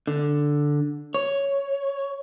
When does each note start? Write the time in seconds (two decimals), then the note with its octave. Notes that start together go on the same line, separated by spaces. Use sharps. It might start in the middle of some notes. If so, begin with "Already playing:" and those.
0.07 D3
1.14 C#5